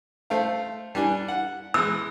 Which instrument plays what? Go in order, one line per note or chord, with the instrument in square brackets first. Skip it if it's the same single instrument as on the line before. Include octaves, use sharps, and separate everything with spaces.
[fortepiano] A3 C5 F5
G3 D4 G#5
F#5
[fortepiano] E3 G#3 [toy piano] E6